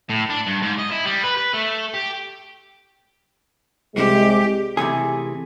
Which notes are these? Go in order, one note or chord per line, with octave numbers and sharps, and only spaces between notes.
A2
D4
G2
G#2
D#5
E4
G3
B4
B4
A3
G4
C2 G#3 G4
C3 E3 A3 G#4